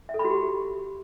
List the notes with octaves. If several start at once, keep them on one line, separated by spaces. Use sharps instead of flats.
E5
A4
B5
F#4
G4